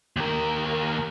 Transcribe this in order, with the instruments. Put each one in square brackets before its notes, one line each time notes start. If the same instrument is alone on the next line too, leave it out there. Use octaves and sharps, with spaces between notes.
[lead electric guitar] D#2 A#4